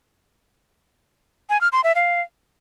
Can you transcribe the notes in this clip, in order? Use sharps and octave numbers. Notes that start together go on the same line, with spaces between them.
G#5
F6
C6
E5
F5